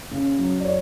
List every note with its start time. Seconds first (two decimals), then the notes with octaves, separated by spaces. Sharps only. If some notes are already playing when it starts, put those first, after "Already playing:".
0.11 C#3
0.38 F#3
0.60 D5
0.65 C#5